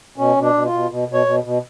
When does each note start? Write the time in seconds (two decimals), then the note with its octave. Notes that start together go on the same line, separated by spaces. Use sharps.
0.18 B2 C#4
0.36 B2
0.42 D4
0.54 B2
0.65 F4
0.72 B2
0.90 B2
1.08 B2
1.14 C#5
1.26 B2
1.44 B2